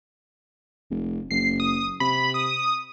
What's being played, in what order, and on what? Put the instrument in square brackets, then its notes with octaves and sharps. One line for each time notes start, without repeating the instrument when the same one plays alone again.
[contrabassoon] F1
[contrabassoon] F#1 [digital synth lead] C7
[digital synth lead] D#6
[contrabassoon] C3 [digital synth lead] B5
[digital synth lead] D#6